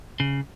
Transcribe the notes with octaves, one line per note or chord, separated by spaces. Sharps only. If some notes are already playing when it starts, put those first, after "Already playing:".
C#3